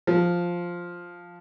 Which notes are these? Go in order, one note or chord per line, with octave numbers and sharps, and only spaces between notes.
F3